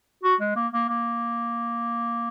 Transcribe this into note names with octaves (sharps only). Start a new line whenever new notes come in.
F#4
G#3
A#3
A#3
A#3